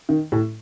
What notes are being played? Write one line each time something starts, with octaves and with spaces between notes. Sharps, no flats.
D#3
A2